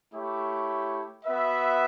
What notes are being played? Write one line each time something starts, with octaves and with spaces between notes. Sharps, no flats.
A3 E4 G4 C#5
B3 F#4 B4 E5